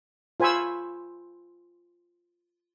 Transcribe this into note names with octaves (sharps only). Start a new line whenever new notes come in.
F4 C5 G#5 B5 C#6 E6